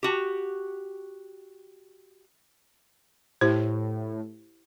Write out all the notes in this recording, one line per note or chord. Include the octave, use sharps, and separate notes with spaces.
F#4 G4
A2 E4 G4 C5